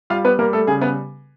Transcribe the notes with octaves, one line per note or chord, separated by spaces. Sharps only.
G3 F4 F5
B3 B4
G3 A#3 A#4
A3 A4
C#3 G#4
B3 B4